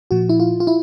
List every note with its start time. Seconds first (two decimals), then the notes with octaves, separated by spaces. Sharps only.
0.11 A#2 F3 F#4
0.29 E4
0.40 F4
0.60 F4
0.67 E4